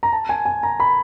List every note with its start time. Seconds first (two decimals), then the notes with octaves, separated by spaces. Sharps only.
0.03 A#5
0.13 A5
0.29 G#5
0.45 G#5
0.63 A#5
0.80 B5